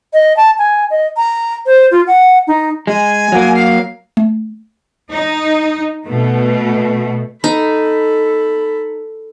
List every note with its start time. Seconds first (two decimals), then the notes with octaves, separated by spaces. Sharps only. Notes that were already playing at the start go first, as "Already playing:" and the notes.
0.13 D#5
0.37 A5
0.59 G#5
0.90 D#5
1.17 A#5
1.66 C5
1.91 F4
2.07 F#5
2.47 D#4
2.87 G#3 G#5
3.32 F#3 A#3
3.54 F5
4.17 A3
5.12 D#4
6.05 B2 A3
7.44 D#4 A4 B5